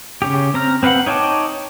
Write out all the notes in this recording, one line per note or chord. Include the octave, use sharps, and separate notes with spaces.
C#3 C#4 G4
C4 A#5 F6
C4 B4 F5 F#5 B5
D#4 C#5 G5 A5 D6